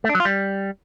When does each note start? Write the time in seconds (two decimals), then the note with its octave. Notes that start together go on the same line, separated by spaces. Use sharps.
0.04 A3
0.09 D4
0.15 F#3
0.20 F4
0.25 G3